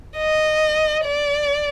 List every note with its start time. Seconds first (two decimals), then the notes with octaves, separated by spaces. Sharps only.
0.18 D#5
1.05 D5